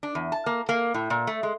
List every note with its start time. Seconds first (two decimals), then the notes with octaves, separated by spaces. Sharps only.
0.03 D4
0.15 E2
0.32 A5
0.46 A#3
0.69 A#3
0.94 A2
1.10 A#2
1.27 A3
1.43 G#3